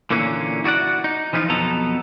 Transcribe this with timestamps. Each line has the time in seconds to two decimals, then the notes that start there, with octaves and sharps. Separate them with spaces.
0.11 A#2 D3 E3 A#3 C#4
0.64 E4 F#4 G#4 D5 F#5
1.04 D#4
1.33 E3 F3 G3 B3 D#4 F4
1.49 B1 F2 B2 B3 A4 A#5